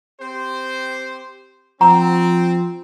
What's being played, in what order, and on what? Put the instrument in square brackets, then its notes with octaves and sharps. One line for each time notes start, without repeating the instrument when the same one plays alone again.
[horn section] C4 G4 C5
[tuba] F3 [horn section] C4 [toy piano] F#5 A#5 C#6